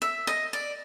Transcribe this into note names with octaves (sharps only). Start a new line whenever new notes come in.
E5
D#5
D5